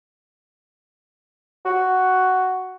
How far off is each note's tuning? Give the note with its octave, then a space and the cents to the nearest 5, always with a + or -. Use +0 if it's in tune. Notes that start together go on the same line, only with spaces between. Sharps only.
F#4 +5